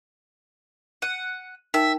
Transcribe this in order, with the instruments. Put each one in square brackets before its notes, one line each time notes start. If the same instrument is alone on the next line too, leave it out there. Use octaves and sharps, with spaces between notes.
[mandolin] F#5 [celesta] D#7
[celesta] D#4 A#4 G5 [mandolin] E5